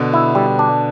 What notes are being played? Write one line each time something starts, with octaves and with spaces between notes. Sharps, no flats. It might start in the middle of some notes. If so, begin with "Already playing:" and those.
Already playing: B2 D3
E4
G3
D4